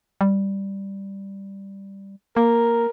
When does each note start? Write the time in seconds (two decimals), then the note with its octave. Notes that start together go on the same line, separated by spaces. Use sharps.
0.21 G3
2.37 A#3 A#4